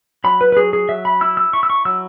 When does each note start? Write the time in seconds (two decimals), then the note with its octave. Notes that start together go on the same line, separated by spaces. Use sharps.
0.24 F#3 B5
0.41 B4
0.52 B4
0.57 F#3 G#4
0.73 G#4
0.89 F#3 E5
1.05 B5
1.21 E4 E6
1.37 E6
1.53 E4 C#6
1.63 E6
1.70 C#6
1.85 F#3 E6